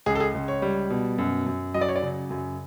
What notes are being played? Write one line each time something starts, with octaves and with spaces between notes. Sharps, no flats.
C#2 G#4
A4
G#4
C#2
C#5
G3
B2
F#2
F#2
F#3 D#5
D5
C#5
D5
C#3
F#2